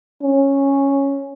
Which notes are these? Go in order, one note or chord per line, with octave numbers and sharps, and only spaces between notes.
C#4